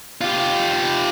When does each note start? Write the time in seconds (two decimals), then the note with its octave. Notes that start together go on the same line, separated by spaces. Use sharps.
0.21 F4 G4